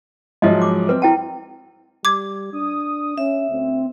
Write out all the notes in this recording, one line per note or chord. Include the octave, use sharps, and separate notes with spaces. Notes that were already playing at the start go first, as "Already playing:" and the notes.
G#2 F3 F#3 D#5 E5
D6
C4 B4
E4 G5 A5
G3 D6 G#6
D4 D#6
C#4 E5
D2 C4